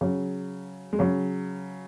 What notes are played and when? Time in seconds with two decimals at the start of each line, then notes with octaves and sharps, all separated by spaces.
0.01 C#3 F#3
0.93 G#3
0.99 C#3 F#3